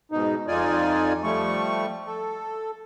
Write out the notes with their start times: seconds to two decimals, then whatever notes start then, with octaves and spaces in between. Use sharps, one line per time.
0.12 G#2 B2 D#4
0.48 F2 D#4 F4 D5 G#5
1.23 F3 G3 A3 C#6
2.07 A4